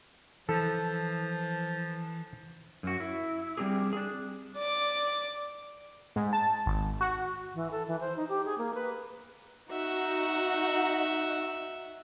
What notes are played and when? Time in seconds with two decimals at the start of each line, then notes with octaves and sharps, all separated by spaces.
0.49 E3 F3 A4
2.83 F#2 F#4
3.00 E4
3.57 G3 C4 D4 G4 G#4
3.93 D4 G#4
4.56 D5 D6
6.16 G#2
6.33 A5
6.66 G#1
7.01 F#4
7.54 E3
7.71 A4
7.88 E3
8.01 C5
8.17 D#4
8.29 G4
8.45 G#4
8.58 A#3
8.74 B4
9.71 D#4 F#4 E5 F#5